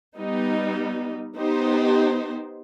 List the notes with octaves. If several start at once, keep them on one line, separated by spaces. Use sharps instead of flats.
G3 B3 D#4
B3 D#4 G4 C5